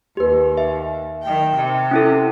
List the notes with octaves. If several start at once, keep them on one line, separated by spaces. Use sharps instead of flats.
D#2 G4 B4
E5
D#3 G5
C3
C#4 E4 A4